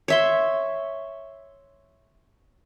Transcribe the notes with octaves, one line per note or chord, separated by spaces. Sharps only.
C#5 E5 C6